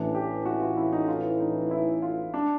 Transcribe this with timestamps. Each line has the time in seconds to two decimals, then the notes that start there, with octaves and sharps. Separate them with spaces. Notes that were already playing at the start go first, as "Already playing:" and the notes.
Already playing: A1 A2 E3 D4
0.15 G4
0.46 F#4
0.61 F4
0.77 E4
0.92 D#4
1.08 F4
1.40 D#4
1.71 E4
2.02 F4
2.34 D4